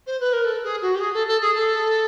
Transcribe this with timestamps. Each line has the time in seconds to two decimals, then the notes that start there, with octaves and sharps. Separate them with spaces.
0.07 C5
0.20 B4
0.33 A#4
0.45 A4
0.63 G#4
0.82 F#4
0.95 G4
1.00 G#4
1.13 A4
1.27 A4
1.41 G#4
1.55 A4